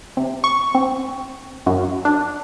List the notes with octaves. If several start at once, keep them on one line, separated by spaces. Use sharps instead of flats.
C3
C#6
C4
F#2
D4